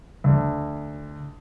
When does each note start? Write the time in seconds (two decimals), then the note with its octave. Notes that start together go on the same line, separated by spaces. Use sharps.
0.24 D2